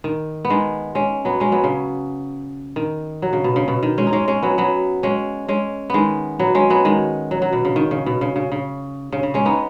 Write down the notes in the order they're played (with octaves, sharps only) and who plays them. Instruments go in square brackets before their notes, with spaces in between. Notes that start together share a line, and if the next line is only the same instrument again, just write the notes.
[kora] D#3
B3
D#3 G#3
G#3 C#4
F#3 B3
G#3 C#4
F#3 B3
C#3
D#3
F#3
C#3
B2
C#3
B2
D#3
G#3 C#4
D#4
G#3 C#4
G#3 C#4
F#3 B3
F#3 B3
G#3 C#4
G#3 C#4
D#3 G#3 B3
F#3 B3
G#3 C#4
F#3 B3
D#3 G#3
F#3
F#3
B2
C#3
D#3
C#3
B2
C#3
C#3
C#3
C#3
C#3
G#3 C#4
B3 D#4